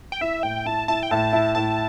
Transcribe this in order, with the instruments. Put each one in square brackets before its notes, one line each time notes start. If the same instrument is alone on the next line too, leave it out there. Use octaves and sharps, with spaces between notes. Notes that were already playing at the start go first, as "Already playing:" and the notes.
[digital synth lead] G5
[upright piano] E4 [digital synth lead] E5
[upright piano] A2 [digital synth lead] G5
[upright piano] E4 [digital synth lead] A5
[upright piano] E4 [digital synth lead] A5
[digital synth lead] G5
[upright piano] A2 [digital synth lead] A5
[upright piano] E4
[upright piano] A2 [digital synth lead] A5